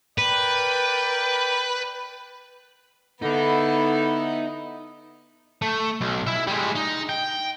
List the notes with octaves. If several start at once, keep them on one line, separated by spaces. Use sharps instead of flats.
A#4 B4 D5 G5
D3 B3 D#4 E4
A3
B1
E4 E5
G3 G#3
D#4
G5